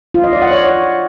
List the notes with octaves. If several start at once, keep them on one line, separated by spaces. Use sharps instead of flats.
F4
D#5
D5
F#5
C#5